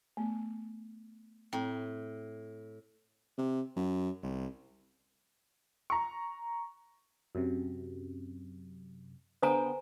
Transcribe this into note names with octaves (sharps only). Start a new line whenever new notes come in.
A3 B3
A2 C4 G5
C3
F#2
C2
A#5 C#6
F#2 C3
D3 B3 C5 G5 G#5 A#5